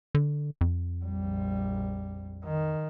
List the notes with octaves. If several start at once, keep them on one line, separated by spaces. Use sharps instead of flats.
D3
F2
A#1 G3
D#3